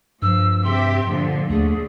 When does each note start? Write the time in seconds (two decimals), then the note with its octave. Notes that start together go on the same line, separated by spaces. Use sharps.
0.22 G2 F3 E6
0.64 C3 G4 E5 C6
1.09 A#2 D3 F3
1.50 D#2 D3 A3 G#4